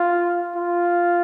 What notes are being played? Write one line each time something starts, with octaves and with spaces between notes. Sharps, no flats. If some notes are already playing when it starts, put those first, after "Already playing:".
Already playing: F4
F4